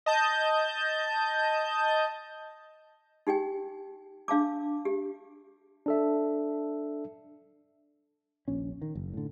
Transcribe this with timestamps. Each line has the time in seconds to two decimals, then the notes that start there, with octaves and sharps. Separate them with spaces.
0.06 D#5 A5 G6
3.27 D#4 G4 G5 G#5
4.28 D4 F5 A5 D6
4.85 G4
5.86 D4 A4 E5
8.48 D#1 A#1 C#4
8.82 D#3
8.95 F#1
9.13 A2 D3